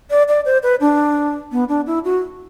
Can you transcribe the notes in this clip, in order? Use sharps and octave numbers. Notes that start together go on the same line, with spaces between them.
D5
D5
C5
B4
D4
B3
D4
E4
F#4